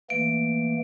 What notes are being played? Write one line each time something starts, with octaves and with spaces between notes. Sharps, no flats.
E3 A3 A#3 D7